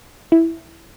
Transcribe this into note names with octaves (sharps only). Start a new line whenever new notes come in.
E4